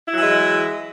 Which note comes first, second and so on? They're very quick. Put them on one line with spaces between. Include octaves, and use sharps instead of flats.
E4 F#3 E3 G#3